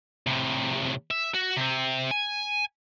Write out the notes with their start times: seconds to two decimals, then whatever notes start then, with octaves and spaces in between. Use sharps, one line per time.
0.27 A2 C3
1.11 E5
1.34 F#4
1.57 C3 C4
2.11 G#5